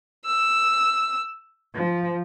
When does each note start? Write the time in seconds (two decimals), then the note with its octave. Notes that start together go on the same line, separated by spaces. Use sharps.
0.24 E6
1.75 F3